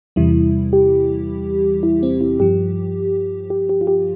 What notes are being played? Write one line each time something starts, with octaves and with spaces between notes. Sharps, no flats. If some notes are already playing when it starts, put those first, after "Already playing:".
E2 C3 E3 G3 E4
G4
E4
C4
E4
G2 F3 G4
G4
G4
F4
G4